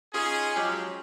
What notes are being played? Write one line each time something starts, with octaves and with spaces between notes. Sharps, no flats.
C#4 D#4 F4 G#4
F3 F#3 G#3 C#4 G4